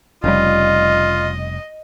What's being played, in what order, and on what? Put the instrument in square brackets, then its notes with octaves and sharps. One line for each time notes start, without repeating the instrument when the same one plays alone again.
[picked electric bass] F1 C#3 G3 [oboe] F4 [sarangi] D#5